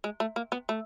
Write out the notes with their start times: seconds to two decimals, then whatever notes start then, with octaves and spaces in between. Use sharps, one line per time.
0.04 G#3
0.20 A3
0.36 A#3
0.52 B3
0.69 A3